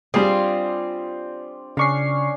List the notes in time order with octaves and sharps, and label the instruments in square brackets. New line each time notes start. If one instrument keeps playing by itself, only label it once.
[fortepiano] G3 G#4 [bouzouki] C4 F4 [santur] D4
[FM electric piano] C#3 C#6 C7 [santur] C#4 D4 F5